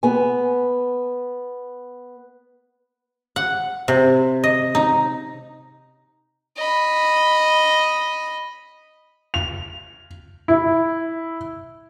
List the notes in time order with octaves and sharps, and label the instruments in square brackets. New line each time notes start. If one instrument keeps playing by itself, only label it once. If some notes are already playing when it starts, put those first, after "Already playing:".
[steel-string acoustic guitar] B3 G#5
[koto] F#5
C3
D#5
D#4
[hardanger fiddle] D#5 B5
[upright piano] F7
E4